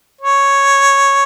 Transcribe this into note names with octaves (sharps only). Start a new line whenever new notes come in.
C#5